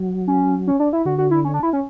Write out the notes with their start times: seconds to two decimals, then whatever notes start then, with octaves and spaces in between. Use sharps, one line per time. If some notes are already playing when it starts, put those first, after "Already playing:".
Already playing: F#3
0.28 C#4
0.67 C#4
0.80 D4
0.93 E4
1.05 D3 F#4
1.18 F#4
1.31 E4
1.45 C#4
1.54 D4
1.63 E4
1.73 C#4